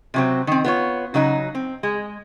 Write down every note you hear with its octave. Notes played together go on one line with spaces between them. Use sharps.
C3 F#3 C4
D#3 C4
B3 F4 C#5
C#3 F#3 D#4 F#4
C4
G#3